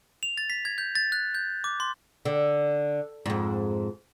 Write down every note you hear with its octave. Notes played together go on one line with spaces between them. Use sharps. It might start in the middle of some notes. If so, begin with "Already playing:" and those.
F7
A6
B6
G#6
G6
A6
F#6
G6
D6
C6
D3
F2 G#2